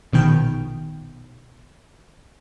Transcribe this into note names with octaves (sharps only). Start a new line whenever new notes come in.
A#1 B2 D#3 G5